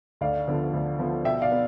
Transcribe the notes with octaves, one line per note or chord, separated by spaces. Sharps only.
D2 D5 F5
D3 F3 B3
D2
D3 F3 B3
B2 E5 G5
D5 F5
B3